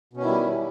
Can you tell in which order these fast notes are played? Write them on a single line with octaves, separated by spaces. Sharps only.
B2 C#4 D#3 E4 G3